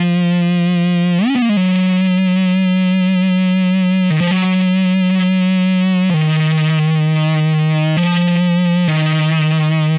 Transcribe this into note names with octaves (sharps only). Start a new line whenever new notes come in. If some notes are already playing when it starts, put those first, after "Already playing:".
Already playing: F3
C#4
B3
A#3
G#3
F#3
D#3
F3
F#3
F3
D#3
F3
D#3